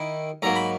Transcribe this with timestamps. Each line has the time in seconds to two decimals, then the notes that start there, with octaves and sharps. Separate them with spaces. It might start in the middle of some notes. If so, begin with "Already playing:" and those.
Already playing: D#3 A#3 E4
0.42 G#2 F#3 A#3 A#5
0.56 B5